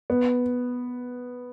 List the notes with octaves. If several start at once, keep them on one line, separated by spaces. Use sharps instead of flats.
B3